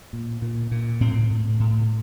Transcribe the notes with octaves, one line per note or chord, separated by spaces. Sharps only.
A#2
A#2
A#2
A2 C4
A2
A2